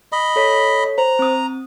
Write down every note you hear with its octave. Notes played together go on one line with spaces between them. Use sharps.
D#5 B5
A4 C#5 B6
C5 A#5
C4 D#6